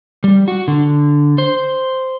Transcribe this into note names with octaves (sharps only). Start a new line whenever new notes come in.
G3
F#4
D3
C5